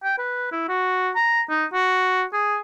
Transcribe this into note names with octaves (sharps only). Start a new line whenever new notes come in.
G5
B4
E4
F#4
A#5
D#4
F#4
G#4